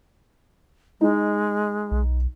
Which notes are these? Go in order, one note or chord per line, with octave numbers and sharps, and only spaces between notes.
G#3 D#4
B1